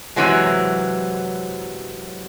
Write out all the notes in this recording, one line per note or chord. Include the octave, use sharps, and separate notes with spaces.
F#2 C3 E3 F#3 G#3